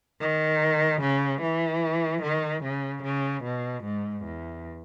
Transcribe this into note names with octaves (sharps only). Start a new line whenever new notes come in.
D#3
C#3
E3
D#3
C#3
C#3
B2
G#2
E2